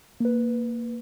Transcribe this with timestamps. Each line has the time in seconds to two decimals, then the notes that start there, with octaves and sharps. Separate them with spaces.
0.20 A#3 B4